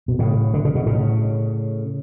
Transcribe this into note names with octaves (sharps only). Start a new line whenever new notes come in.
B2
A2 C#3
D3
C#3
B2
A2 C#3